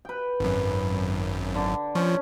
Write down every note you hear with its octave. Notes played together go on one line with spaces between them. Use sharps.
B4 G5
G#1 F#2
D3
F3 C#4